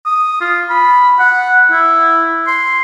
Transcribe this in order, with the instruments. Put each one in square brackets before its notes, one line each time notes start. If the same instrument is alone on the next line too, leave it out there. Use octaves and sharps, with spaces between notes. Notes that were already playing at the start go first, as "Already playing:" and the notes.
[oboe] D#6
F4
B5
F#5
E4
C6